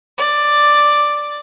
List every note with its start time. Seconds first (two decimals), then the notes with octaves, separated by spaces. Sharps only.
0.19 D5